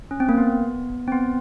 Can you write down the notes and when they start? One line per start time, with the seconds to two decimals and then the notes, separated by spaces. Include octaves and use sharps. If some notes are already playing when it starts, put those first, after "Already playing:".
0.11 C#4
0.20 C4
0.29 A#3
0.38 B3
1.07 C4
1.12 B3